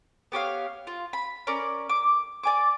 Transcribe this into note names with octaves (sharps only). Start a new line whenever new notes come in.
B3 G4 C#5 F5
F4
B5
C#4 A#4 D5
D6
D5 G#5 D6